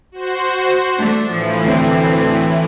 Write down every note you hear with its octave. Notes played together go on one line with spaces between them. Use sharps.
F#4 C5
A3 D4
A2 E3 F3
D2 C4